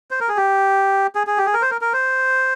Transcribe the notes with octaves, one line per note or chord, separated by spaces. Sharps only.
C5
A#4
G#4
G4
G#4
G#4
G4
G#4
A#4
C5
A#4
A#4
C5